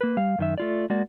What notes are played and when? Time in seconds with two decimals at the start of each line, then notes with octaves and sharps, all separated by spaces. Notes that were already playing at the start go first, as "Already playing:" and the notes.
0.01 A#3 B4
0.17 G3 F5
0.38 F#2 D#3 E5
0.58 A3 F4 D5
0.90 G#3 A#3 F#4 D5